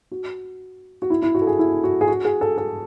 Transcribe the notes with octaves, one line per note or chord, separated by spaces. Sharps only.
F#4
F#4
E4
E4
F#4
A4
G#4
E4
F#4
G#4
F#4
G#4
A4
A4